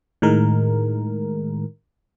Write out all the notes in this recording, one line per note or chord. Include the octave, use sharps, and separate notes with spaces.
A2 D#3 G#3 A#4